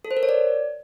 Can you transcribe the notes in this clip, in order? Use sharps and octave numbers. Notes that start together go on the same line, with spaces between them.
A4
C5
A#4
C#5
D5